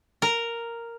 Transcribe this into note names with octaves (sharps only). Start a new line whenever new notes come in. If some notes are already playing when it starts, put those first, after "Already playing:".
A#4